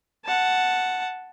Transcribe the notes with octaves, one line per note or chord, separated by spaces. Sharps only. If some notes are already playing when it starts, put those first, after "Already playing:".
F#5 A5